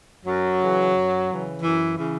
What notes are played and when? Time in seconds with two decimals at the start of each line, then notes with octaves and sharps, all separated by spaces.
0.24 F#2 F#3
0.59 C#3 E3
0.93 F#2
1.28 C#3 E3
1.62 F#2 E3
1.97 C#3 E3